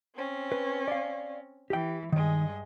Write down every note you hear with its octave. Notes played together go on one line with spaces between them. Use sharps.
C4 C#4
B4
D5 F5
E3 G4 G5
G2 D#3 G#3 D#5